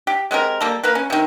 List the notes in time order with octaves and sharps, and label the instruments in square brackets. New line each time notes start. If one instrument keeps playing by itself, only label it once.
[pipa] G4
G#3 C4 G4 A#4
G3 A#3 A4
A#3 A#4 B4
C#4
C3 D#3